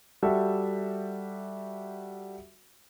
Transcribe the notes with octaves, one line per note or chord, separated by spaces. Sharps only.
G3 F#4 G4 A4 E5